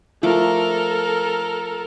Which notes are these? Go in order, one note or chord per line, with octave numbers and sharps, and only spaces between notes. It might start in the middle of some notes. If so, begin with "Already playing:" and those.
F3 A3 A4 A#4 D6